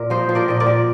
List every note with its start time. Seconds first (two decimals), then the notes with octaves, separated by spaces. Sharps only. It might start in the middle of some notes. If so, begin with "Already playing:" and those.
Already playing: A#2 A#4
0.10 F3 C5 D#5
0.29 F3
0.35 A#4 D5
0.48 A#2 D#5
0.60 A#4 D5
0.66 A#2